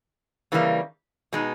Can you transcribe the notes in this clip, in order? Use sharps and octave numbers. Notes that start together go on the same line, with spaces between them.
C#3 E3 G3 A#3
B2 G#3 D#4